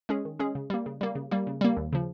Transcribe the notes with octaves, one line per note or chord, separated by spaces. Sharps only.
G#3 C#4 G#4
D#3
G#3 C#4 G#4
C#3
G3 A#3
C#3
G3 A#3
C#3
G3 A#3
C#3
G3 A#3
D#2
C#3 F3